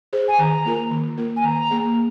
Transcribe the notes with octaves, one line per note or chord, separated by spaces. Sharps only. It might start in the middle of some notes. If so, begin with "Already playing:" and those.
G#4 C5
G#5
D#3 A#5
A#3 F4 A#4
D#3
A#3 F4 A#4
G#5
D#3 A#5
A#3 G#4